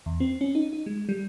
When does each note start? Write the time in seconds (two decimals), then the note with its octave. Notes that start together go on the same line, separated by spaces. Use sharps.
0.06 E2
0.20 C4
0.41 C#4
0.55 D#4
0.73 D#4
0.86 G#3
1.09 G3